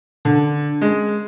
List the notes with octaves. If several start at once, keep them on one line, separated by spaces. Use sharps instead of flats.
D3
G#3